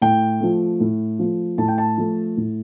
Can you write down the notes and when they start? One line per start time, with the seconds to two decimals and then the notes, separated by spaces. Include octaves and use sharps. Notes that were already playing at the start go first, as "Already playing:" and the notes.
0.02 A2 G5
0.41 F3 A3
0.80 A2
1.19 F3 A3
1.58 A2 A5
1.68 G5
1.78 A5
1.98 F3 A3
2.37 A2